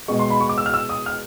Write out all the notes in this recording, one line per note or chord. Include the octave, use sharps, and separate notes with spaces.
B2 G#3 C#6
C6
B5
C#6
D6
E6
F6
E6
D#6
F6